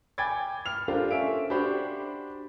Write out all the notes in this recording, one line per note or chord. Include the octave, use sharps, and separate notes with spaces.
G5 G#5 B5 D6 G#6 A6
F6 F7
D4 F4 G4 A4 A#4 C5
C#4 A4 E5 F5 D7
D4 F#4 G4 C5 B5